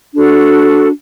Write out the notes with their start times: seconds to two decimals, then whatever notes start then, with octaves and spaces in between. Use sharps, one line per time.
0.14 D4 F#4 A4